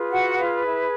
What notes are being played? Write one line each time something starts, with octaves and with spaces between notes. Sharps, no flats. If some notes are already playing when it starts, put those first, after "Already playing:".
Already playing: F4 G#4 B4
F#4 F#5
F4 F5
E4 E5